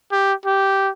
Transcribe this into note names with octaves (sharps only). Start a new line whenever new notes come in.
G4
G4